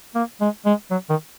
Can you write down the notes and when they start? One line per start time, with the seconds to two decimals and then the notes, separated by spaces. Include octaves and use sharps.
0.15 A#3
0.41 G#3
0.66 G#3
0.91 F#3
1.10 D#3